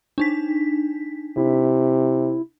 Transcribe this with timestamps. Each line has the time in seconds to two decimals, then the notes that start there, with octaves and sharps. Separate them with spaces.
0.18 D4 D#4 B6
1.37 C3 E4